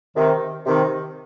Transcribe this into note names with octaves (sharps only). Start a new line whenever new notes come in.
C3 D#3
C3 D#3